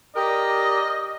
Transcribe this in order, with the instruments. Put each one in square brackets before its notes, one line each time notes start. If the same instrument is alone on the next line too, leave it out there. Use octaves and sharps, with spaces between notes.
[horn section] G4 A#4 D5 [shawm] D#5 [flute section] D#6